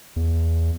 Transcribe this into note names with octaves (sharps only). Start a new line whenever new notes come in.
E2